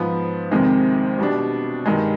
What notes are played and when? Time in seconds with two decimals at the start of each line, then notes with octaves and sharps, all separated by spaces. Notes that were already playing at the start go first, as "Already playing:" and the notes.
Already playing: G#2 F3 B3
0.51 F2 C3 D#3 G#3
1.18 B2 G3 D4
1.86 G2 D#3 G#3